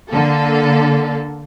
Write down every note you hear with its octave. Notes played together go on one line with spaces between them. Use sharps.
D3 A#3 A4